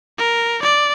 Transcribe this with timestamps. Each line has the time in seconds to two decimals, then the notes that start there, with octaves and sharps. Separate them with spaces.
0.18 A#4
0.63 D5